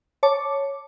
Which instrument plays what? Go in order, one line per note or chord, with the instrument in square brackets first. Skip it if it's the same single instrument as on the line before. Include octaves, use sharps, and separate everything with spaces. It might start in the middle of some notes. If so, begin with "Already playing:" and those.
[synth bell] C#5 A5 D6